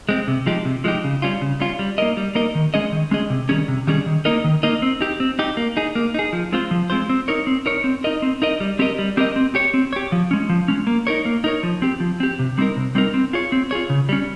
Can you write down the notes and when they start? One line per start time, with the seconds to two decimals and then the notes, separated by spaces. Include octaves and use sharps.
0.09 G#3 C4
0.28 C3
0.46 F3 G#3 D#4 G4
0.65 C3
0.84 F3 G#3 D#4 G4
1.04 C#3
1.22 G3 C#4 F4
1.42 C#3
1.60 G3 C#4 F4
1.79 G3
1.98 A#3 D#4 A#4 D#5
2.17 G3
2.35 A#3 D#4 A#4 D#5
2.55 D#3
2.74 G#3 C#4 G#4 D#5
2.92 D#3
3.11 G#3 C#4 G#4 D#5
3.30 C3
3.49 D#3 G3 C#4 G#4
3.68 C3
3.87 D#3 G3 C#4 G#4
4.06 D#3
4.25 A#3 D#4 A#4 D#5
4.44 D#3
4.63 A#3 D#4 A#4 D#5
4.82 C4
5.01 D#4 G4
5.20 C4
5.39 D#4 G4
5.57 A#3
5.77 D#4 G#4
5.95 A#3
6.14 D#4 G#4
6.33 F3
6.52 G#3 C4 F4 C5
6.71 F3
6.90 G#3 C4 F4 C5
7.09 C4
7.28 D#4 A#4 C#5
7.47 C4
7.66 D#4 A#4 C#5
7.84 C4
8.04 D#4 A#4 D#5
8.22 C4
8.42 D#4 A#4 D#5
8.60 G3
8.79 C4 G4 A#4 D#5
8.99 G3
9.17 C4 G4 A#4 D#5
9.36 C4
9.55 G4 C#5
9.74 C4
9.93 G4 C#5
10.12 F3
10.31 G#3 C#4
10.50 F3
10.68 G#3 C#4
10.87 A#3
11.07 D#4 A#4 C#5
11.26 A#3
11.44 D#4 A#4 C#5
11.63 F3
11.82 C4 G4
12.00 F3
12.20 C4 G4
12.39 C3
12.58 G3 C4 D#4 A#4
12.76 C3
12.95 G3 C4 D#4 A#4
13.14 C4
13.33 F4 G#4 C#5
13.52 C4
13.71 F4 G#4 C#5
13.90 C#3
14.09 G3 C#4